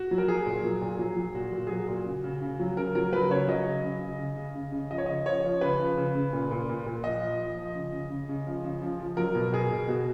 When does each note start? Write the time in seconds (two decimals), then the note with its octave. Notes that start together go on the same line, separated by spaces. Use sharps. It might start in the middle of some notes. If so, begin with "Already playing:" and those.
Already playing: F#4
0.11 F#3
0.18 A#4
0.28 F#3 G#4
0.46 A#2
0.64 F#3
0.82 A#2
0.99 F#3
1.17 F#3
1.35 A#2 F#4
1.53 A#2
1.67 G#4
1.70 F#3 F#4
1.89 A#2
2.06 C#3
2.24 C#3
2.42 C#3
2.59 F#3
2.77 C#3 A#4
2.95 F#3 A#4
3.13 F#3 B4
3.30 C#3 C#5
3.48 F#3 D#5
3.66 C#3
3.84 C#3
4.02 C#3
4.19 C#3
4.37 C#3
4.56 C#3
4.72 C#3
4.91 F3 D#5
4.98 C#5
5.06 C#3 D#5
5.26 F3 C#5
5.45 F3
5.61 C#3 B4
5.80 F3
5.97 C#3
6.15 C#3
6.33 A#2
6.51 A#2
6.69 A#2
6.86 A#2
7.04 F3 D#5
7.21 F3
7.40 F3
7.58 F3
7.75 C#3
7.93 C#3
8.11 C#3
8.29 C#3
8.47 F3
8.65 C#3
8.81 F3
8.99 F3
9.17 F#3 A#4
9.35 B2
9.53 B2 G#4
9.71 B2
9.88 B2 F#4